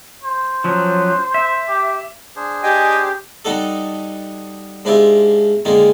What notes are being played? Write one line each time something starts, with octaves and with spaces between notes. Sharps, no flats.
C5
F3 F#3 C#4
E5
G4
D4 G#4 C5
G4 D#5 G5 G#5
G3 D#4 F#4 A4
G#2 D4 E4 F4 G4 E5
D3 D#3 G#3 A#3 F4